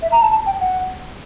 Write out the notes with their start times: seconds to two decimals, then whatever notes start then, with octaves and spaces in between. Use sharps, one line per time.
0.02 E5
0.12 A#5
0.21 A5
0.31 A5
0.45 G5
0.60 F#5